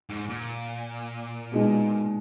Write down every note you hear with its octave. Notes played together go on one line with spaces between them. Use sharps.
G#2
A#2
B2 G#3 D#4